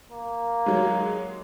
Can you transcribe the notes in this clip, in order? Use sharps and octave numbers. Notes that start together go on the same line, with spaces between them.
A#3
F#3 G#3